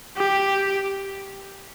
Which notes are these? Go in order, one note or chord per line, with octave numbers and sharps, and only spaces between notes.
G4